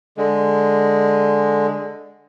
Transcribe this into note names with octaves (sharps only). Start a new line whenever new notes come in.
D3 G#3